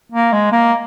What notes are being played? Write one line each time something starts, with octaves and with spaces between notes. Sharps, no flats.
A#3
G#3
A#3